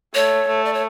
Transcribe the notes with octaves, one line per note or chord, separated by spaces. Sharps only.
A3 C#5
A3
D5
C#5